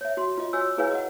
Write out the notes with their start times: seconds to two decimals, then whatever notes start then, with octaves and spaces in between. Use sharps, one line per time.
0.01 C#5 E5
0.17 F#4 C6
0.38 F4 D#5
0.53 F#4 C#5 G#5 E6
0.78 E4 G#4 B4 C#5 F5 G#5
0.91 D#5 F#5